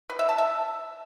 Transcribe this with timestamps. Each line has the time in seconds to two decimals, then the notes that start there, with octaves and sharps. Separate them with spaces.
0.10 B4
0.19 E5
0.29 A5
0.38 E5